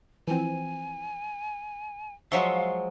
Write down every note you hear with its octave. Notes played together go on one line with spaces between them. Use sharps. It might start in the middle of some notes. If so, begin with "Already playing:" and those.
E3 F3 C4 G#5
F3 F#3 G#3 E5 F5 C6 C#6